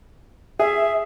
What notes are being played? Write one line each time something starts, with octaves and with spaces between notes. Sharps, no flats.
G#4 E5